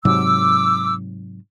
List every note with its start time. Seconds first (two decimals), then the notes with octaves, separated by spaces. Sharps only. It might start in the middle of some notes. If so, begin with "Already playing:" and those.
0.05 G#2 C3 F#3 D6 E6